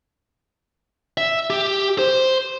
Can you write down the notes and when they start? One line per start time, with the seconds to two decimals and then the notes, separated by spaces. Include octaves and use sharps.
1.18 E5
1.50 G4
1.99 C5